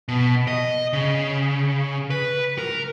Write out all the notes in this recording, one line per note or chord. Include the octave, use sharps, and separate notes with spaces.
B2
D#5
C#3
B4
A#4